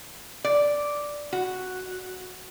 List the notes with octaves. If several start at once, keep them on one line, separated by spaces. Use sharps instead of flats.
D5
F#4